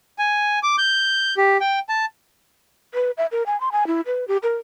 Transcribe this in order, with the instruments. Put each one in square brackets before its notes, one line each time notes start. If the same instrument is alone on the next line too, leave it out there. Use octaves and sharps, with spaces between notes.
[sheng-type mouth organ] G#5
D6
G6
G4
G5
A5
[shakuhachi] B4
E5
A#4
G#5
C6
G#5
E4
B4
G4
A#4